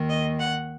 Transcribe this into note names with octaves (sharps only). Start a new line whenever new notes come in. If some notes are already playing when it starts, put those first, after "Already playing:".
Already playing: D#2 D#3
D#5
F#5